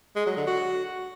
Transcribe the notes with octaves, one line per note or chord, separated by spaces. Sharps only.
G#3
F#3
D3
F#4